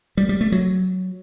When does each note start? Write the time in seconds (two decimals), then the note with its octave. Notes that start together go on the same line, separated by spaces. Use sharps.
0.17 G3
0.29 G3
0.41 A3
0.52 F#3